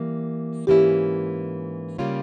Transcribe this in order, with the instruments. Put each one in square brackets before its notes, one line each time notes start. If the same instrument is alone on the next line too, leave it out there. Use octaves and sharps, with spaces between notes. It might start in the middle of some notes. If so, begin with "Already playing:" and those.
Already playing: [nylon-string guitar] E3 G3 A#3
[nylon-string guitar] G#2 E3 A#3 C#4 E4 [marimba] G4
[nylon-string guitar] C#3 G3 A#3 C#4 F4